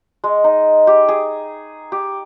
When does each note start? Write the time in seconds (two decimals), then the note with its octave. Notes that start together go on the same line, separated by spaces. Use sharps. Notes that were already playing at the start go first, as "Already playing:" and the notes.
0.24 G#3
0.44 D#4
0.87 G4
1.09 G#4
1.92 G4